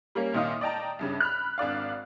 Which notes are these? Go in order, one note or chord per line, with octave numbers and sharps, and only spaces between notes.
G3 A#3 C#4
C2 A#2 D#3 D#5 F5 D#6
D5 D#5 G5 A5 A#5
C2 G2 C#3
B5 F6 F#6
G#1 D4 D5 F5